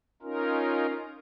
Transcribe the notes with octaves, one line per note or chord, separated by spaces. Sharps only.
C#4 D#4 F4 A#4